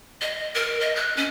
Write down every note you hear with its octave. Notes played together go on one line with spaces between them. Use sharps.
D#5
A#4
D#5
F#6
C#4